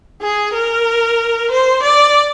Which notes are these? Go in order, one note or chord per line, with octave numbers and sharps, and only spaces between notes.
G#4
A#4
C5
D5